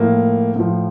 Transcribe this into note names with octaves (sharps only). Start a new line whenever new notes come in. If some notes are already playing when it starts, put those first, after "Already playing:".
Already playing: A2 F3 A#3
A2 F3